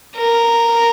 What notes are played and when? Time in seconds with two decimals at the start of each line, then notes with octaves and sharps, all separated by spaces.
0.17 A#4